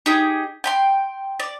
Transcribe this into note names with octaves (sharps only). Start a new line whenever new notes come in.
D#4 G4 G#4
G5 B5 C6
D5